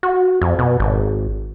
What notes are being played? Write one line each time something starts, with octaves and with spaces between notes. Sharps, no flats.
F#4
F2
B2
G#1